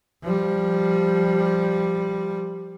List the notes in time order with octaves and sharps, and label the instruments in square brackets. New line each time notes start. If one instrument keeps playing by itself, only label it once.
[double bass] F3 G3